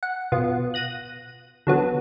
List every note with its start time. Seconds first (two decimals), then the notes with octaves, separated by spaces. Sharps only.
0.03 F#5
0.32 B2 B3 F4
0.74 F#6 A#6 D#7
1.67 D3 F#3 B3